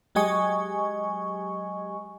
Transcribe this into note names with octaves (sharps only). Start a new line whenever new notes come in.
F#3 G#3 G4 D#5 G#5 C#6